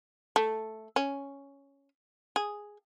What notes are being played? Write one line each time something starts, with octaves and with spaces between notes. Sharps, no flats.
A3
C#4
G#4